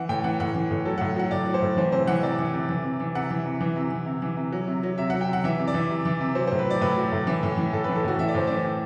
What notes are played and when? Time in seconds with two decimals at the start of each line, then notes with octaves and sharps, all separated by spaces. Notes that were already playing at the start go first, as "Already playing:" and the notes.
Already playing: E3 F#5
0.09 A2 G5
0.24 E3 F#5
0.40 A2 F#5
0.55 E3
0.71 A2
0.85 F#3 A4
0.98 A2 F#5
1.16 F#3 F#5
1.31 A2 D5
1.47 F#3
1.54 C5
1.62 A2
1.77 E3 C5
1.92 C3 C5
2.07 E3 F#5
2.23 C3 D5
2.39 E3
2.53 C3
2.69 E3
2.85 C3
3.00 E3
3.15 C3 F#5
3.31 E3
3.45 C3
3.60 E3
3.76 C3
3.91 E3
4.06 C3
4.22 E3
4.37 C3
4.52 F#3
4.68 C3
4.83 F#3
4.98 C3 E5
5.10 F#3 F#5
5.21 G5
5.28 C3 F#5
5.44 E3 E5
5.59 C3
5.68 D5
5.74 E3
5.90 C3
6.05 E3
6.21 C3
6.35 F#3 C5
6.47 A2 C5
6.59 B4
6.66 F#3 D5
6.81 A2 B4
6.97 F#3
7.12 A2
7.27 E3
7.43 A2
7.58 E3
7.73 A2 A4
7.84 E3 B4
7.96 A4
8.04 A2 F#4
8.19 E3 E5
8.28 D5
8.34 A2 C5
8.47 E3 D5
8.64 A2